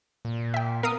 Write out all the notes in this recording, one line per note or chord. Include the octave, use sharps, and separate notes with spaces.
A#2
E5 G5
B3 A#4 F5 D#6